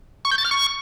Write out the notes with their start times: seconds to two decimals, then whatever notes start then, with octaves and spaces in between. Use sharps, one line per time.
0.25 C#6
0.31 G6
0.38 A6
0.45 F6
0.51 C#6